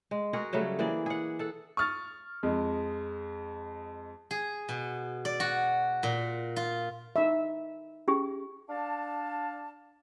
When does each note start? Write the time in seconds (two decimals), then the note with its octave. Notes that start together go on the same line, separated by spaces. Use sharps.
0.11 G#3
0.33 F#4 G#4 A#4 F#5
0.53 C#3 F#3 G3 A3
0.79 E3 A#3 G#4 D5
1.06 G#4 F#5
1.39 A4 F#5
1.77 C#6 D#6 F6 A6
2.43 F2 G#3
4.31 G#4
4.69 B2
5.25 D5
5.40 F#4
6.03 A#2
6.56 F4
7.16 D#4 E5
8.08 C#4 G4 G#4
8.70 D4 F5 A5